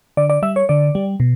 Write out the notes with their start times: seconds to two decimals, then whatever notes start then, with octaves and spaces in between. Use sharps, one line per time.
0.17 D3 D5
0.30 D5
0.42 G3 E5
0.56 C#5
0.69 D3 D5
0.95 G3
1.20 B2